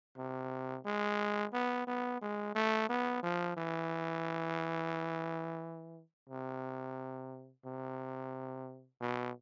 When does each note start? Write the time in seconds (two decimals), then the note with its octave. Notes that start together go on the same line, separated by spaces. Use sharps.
0.17 C3
0.85 G#3
1.53 B3
1.87 B3
2.22 G#3
2.55 A3
2.89 B3
3.23 F3
3.57 E3
6.29 C3
7.65 C3
9.01 B2